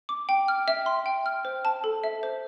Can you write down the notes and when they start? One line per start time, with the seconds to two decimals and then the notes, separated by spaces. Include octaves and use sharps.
0.09 D6
0.29 G5
0.48 F6
0.68 E5
0.86 C6
1.06 G5
1.26 F6
1.45 C5
1.65 A5
1.84 A4
2.04 E5
2.23 C5